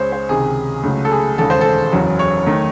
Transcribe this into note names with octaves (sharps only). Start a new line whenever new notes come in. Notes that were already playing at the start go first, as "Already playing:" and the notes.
Already playing: C#2 C#3 G#3 C5 C#5
C5
C#2 C3 D#3 G#4
C#2 C#3 F#3 A3
A4
G#4
E1 D#2 C#3 G#3 A4
C5
A4
F#1 E2 C#3 F#3
C#5
D#3 A3